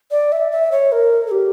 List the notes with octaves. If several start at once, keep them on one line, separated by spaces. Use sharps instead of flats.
D5
E5
E5
C#5
A#4
A4
G4